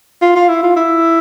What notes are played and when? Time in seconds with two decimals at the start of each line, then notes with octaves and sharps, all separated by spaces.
0.22 F4
0.36 F4
0.49 E4
0.63 F4
0.76 E4